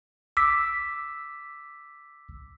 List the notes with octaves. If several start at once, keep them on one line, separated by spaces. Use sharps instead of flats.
D6 E6 B6